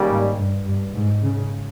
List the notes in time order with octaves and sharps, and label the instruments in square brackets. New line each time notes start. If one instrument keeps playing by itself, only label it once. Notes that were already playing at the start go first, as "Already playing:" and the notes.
Already playing: [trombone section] D#2 C#3 G3 A#3
[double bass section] G#2
G2
G2
G#2
C#3